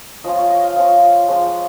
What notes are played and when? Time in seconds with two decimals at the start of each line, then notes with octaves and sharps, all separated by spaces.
0.24 F3 C#4 F4 D#5
0.37 C#5
0.50 D#5
0.64 F5
0.76 F3 C#4 F4 D#5
1.28 F3 G#3 C#4